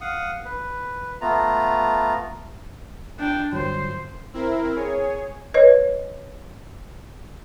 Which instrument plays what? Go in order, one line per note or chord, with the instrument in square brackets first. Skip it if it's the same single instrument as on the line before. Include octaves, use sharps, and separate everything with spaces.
[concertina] F5 F#5 D#6
B4
A3 B3 F4 A#5
[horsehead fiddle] D4 G5
[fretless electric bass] G1 F#3 [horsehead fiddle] C5
[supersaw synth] C4 E4 A#4
G#4 C#5
[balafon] B4 C#5 D#5